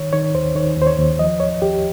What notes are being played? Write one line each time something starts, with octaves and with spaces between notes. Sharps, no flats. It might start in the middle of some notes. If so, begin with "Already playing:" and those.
Already playing: D#3 C#5
D#3 C#5
D#2 C5
D#3 C#5
D#2
C5
C#5
D#2
F3 D#5
D#2 C#5
D#2 G4